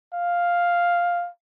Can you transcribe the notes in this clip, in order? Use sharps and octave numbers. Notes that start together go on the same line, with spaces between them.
F5